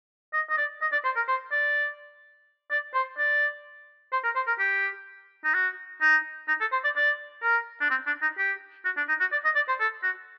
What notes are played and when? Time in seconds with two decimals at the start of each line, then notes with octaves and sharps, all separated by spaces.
0.33 D#5
0.50 D#5
0.58 D5
0.82 D#5
0.92 D5
1.05 C5
1.16 A#4
1.28 C5
1.52 D5
2.71 D5
2.94 C5
3.18 D5
4.13 C5
4.24 A#4
4.36 C5
4.47 A#4
4.59 G4
5.44 D#4
5.54 F#4
6.01 D#4
6.48 D#4
6.61 A4
6.72 C5
6.84 D5
6.96 D5
7.43 A#4
7.81 D4
7.90 C4
8.07 D4
8.22 D#4
8.38 G4
8.85 F#4
8.97 D4
9.09 D#4
9.20 F#4
9.32 D5
9.45 D#5
9.56 D5
9.68 C5
9.80 A4
10.03 F#4